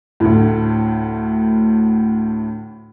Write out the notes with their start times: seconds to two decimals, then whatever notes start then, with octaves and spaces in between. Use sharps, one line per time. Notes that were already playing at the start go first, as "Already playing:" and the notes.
0.20 D2 A2